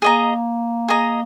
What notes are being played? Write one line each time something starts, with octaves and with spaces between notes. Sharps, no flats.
A#3 G#4 D#5 A#5
G#4 D#5 A#5